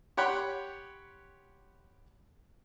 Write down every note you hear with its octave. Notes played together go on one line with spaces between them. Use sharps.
G4 C#5 F#5 G5 B5 C6